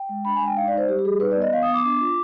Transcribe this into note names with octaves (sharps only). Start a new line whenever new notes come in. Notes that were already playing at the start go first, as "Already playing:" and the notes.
Already playing: G5
G#3
D4 B5
G#5
G#3 G5
D#4 F5
D#4 D5
C5
G3 G4
G4
G3 G#4
D#4 B4
B3 D5
D#5
B3 F5
D#6
B3
D6
D4 D6
F4